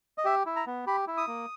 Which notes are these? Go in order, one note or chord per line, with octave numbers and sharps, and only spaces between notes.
D#5
G4 E5
E4
A#5
B3
G4 B5
E4
D#6
A#3